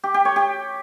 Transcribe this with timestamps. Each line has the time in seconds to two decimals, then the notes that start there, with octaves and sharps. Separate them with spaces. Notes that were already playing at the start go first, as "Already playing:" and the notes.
0.04 G4
0.14 G4
0.25 C#5
0.36 G4